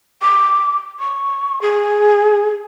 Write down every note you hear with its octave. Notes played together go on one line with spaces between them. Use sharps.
D6
C#6
G#4